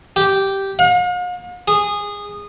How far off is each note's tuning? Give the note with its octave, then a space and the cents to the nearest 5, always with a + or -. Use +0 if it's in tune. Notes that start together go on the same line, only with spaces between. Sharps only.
G4 -5
F5 +45
G#4 -15